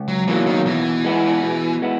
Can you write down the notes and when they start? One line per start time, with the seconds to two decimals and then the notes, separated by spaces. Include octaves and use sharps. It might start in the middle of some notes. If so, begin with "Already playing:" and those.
Already playing: C#2
0.08 F#3
0.28 B2 E3 F#3 A#3
0.46 D#3
0.66 B2 E3
1.04 G#3 B3 E4
1.43 B2
1.82 G#3 B3 E4